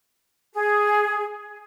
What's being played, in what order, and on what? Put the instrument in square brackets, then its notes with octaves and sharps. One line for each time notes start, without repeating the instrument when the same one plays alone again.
[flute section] G#4